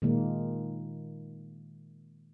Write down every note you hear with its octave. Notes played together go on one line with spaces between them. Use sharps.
A#2 D#3 G#3 A#3